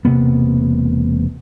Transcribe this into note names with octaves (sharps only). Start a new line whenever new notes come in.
E1 C3 A#3 B3